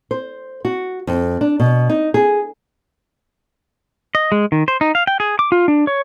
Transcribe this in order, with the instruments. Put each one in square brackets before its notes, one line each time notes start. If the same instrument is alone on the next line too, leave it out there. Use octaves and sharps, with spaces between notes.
[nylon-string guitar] C5
F#4
F2
D4
B2
D#4
G#4
[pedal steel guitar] D#5
G#3
D#3
C5
D#4
F5
G5
G#4
D6
F4
D4
C#5